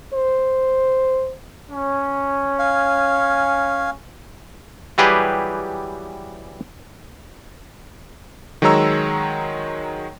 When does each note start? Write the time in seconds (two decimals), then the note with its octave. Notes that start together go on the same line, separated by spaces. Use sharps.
0.14 C5
1.70 C#4
2.59 F5 G#5
4.98 E3 F#3 G3 G4 G#4 B4
8.62 D#3 F#3 G#3 C#5 A#5 E6